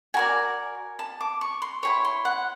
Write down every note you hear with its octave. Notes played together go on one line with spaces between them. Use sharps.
F#4 A#4 D5 G#5
A5
D6
C#6
C6
E4 G#4 C#5 C#6
C6
F#5